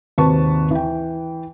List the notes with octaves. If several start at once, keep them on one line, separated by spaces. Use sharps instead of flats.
G#1 D#2 C3 B4 A5 C#6
E3 G5